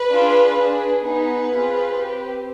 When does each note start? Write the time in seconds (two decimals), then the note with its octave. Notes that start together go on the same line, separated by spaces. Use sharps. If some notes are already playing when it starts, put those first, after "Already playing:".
Already playing: B4
0.10 D4 F4 G#4
0.56 D4 G#4
1.03 B3 D#4 G#4 B4
1.50 C4 F4 G#4
1.97 C4 G4